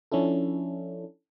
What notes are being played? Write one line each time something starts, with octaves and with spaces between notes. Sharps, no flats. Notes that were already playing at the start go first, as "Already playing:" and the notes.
F3 C#4 D4 E4 A4